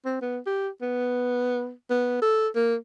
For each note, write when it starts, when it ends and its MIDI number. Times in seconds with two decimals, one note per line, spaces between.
0.05 0.21 60
0.22 0.39 59
0.46 0.69 67
0.82 1.72 59
1.90 2.19 59
2.22 2.48 69
2.55 2.76 58